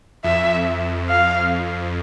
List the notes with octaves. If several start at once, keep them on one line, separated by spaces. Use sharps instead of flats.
F2 E5
F5